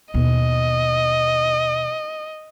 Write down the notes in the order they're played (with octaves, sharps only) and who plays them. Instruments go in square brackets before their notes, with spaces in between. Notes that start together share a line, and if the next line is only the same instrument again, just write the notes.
[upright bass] D#2 B2 [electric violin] D#5